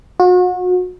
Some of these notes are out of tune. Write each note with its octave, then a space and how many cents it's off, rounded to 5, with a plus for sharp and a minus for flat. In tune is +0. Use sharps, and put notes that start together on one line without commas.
F#4 -35